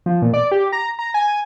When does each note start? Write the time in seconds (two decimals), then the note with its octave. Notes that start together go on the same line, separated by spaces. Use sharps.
0.06 F3
0.22 A#2
0.34 D5
0.52 G4
0.73 A#5
0.99 A#5
1.14 G#5